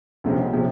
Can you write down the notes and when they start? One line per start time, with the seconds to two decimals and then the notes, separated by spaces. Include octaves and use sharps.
0.24 D2 C3 F3 G#3 C#4
0.53 C3 F3 G#3 C#4